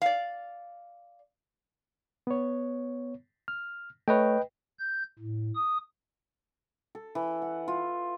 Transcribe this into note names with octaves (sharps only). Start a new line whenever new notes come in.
D5 F5
B3 C#5
F6
A3 B4 C#5 D#5 G5
G6
A2
D#6
A4
E3
F#5
F4